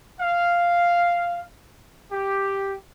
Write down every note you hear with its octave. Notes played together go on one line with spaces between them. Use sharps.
F5
G4